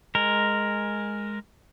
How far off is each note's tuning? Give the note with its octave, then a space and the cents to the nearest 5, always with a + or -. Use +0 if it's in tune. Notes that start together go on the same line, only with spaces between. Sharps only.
G#3 +0 A#4 +0